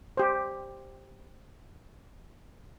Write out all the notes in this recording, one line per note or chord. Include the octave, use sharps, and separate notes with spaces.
G4 C5